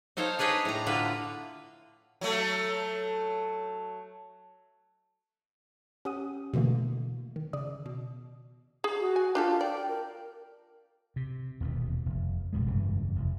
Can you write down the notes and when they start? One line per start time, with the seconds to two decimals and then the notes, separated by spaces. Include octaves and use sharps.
0.17 D#4 A4 C5 C#5 F5
0.39 D4 G#4 B4 C#5 D#5
0.65 A2 A#5
0.87 D3 F4 B4
2.21 F#3 A3
6.05 C#4 G4 F#5 D#6 D#7
6.54 B2 D3 E3 A3 A#3
7.36 D#3
7.53 C#3 D5 D#6
7.86 B2
8.84 G#4
9.00 F#4
9.16 G#5
9.35 D4 F4 G4 A4
9.61 D5 G5
9.89 A#4
11.16 C3
11.61 D#1 E2 B2
12.06 F1
12.53 A1 F#2 B2 G#3
12.66 F1 G2 C#3 E3
13.16 F1 E2